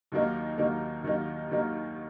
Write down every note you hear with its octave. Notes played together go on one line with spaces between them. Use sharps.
D#2 D#3 F#3 A#3 D#4
D#2 D#3 F#3 A#3 D#4
D#2 D#3 F#3 A#3 D#4
D#2 D#3 F#3 A#3 D#4